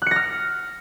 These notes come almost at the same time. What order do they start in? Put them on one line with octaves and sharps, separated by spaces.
F#6 C#7 A#6 F6